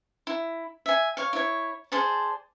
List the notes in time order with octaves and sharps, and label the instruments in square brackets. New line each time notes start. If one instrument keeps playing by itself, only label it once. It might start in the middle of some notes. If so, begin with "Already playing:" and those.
[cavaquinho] E4
E5 G#5
C#5 F5
E4 C#5
G#4 C5 D5 A5